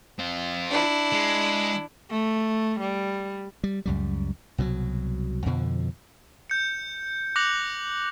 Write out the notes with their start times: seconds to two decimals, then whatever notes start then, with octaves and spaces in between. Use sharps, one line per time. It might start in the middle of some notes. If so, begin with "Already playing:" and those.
0.19 C4 F4
0.70 D4 E4
1.12 G#3
2.10 A3
2.80 G3
3.64 G3
3.86 C#2 F#2 G3
4.58 C2 B2 E3 F#3
5.46 F2 B2 D3 F3
6.50 G6 C#7
7.36 D6 F#6 A#6 C#7 F7 F#7